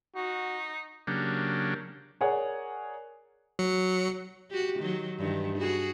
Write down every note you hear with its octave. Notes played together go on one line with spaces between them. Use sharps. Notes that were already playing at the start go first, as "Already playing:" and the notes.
D#4 F#4
C#3 F#3 A#3 D4 G4
G#4 A#4 C#5 D5 F#5 G#5
F#3 C#7
F#4 G4
D#3 F#3
G2 D#3 E3
F#4 G#4